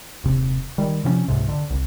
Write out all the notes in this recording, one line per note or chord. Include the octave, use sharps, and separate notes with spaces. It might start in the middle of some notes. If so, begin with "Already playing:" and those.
D#1 C3
D#3 G3
C3 F3 B3 C#4
C#2 G#2 C3
D3
C2